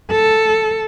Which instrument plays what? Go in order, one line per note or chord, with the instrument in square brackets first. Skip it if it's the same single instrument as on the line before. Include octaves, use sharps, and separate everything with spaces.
[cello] A4